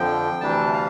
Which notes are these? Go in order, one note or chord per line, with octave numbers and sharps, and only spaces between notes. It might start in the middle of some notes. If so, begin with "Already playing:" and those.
Already playing: F2 D3 F3 G5
D2 C3 E3 G3 D4 A5
F5